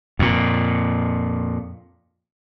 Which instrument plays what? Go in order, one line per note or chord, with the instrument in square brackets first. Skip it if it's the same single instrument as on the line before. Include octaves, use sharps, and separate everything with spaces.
[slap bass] F2 A#2